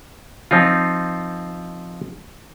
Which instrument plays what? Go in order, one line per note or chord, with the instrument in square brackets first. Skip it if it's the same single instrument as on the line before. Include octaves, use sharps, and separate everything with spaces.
[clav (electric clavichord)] F3 C4 D#4 F4